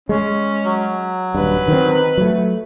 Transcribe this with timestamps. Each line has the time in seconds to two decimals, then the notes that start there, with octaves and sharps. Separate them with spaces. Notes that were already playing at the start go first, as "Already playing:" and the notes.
0.09 G#3 C#4
0.65 F#3
1.35 D#1 G2 B4
1.68 D#3 C4
2.18 F#3 A3